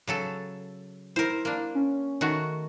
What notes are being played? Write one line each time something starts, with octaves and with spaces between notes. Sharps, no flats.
C#3 F#3 A4
E4 A#4 C5
A#3 D4
C#4
D#3 A3 F#4